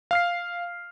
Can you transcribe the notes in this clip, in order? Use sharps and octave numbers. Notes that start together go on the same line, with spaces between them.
F5 F6 C7